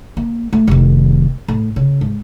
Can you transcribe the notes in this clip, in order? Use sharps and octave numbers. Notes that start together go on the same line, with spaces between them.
A#3
A3
F1 D#3
A2
C#3
G#2